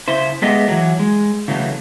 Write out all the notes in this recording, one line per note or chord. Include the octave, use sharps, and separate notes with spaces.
C#3 E4 C5
G#3 A3 B3 G4 G#4 D#5
E3 F#3
G#3
C#3 E3 F#3 A3